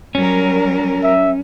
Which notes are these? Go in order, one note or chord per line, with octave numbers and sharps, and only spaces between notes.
F#3 G3 C#4 A#4
E5